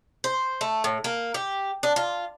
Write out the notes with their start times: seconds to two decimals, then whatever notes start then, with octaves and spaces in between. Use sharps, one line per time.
0.24 C5
0.61 A3
0.84 A2
1.04 A#3
1.34 G4
1.83 D4
1.96 F4